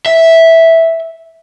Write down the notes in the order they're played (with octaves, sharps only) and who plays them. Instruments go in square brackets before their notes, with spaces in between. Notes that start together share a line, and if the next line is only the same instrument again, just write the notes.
[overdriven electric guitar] E5